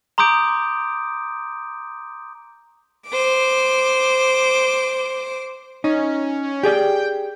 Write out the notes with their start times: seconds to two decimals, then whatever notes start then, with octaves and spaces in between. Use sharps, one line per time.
0.18 A#5 C6 D6 D#6 G6 D7
3.09 C5 D6
5.84 C#4 D#4
6.63 G4 G#4 D5 G5